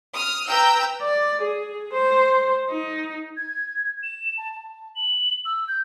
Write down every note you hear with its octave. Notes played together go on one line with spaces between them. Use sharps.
D#6 F6
B4 G5 A#5 E6 G6
D5
G#4
C5
D#4
G#6
E7
A5
A5
F#7
E6
G6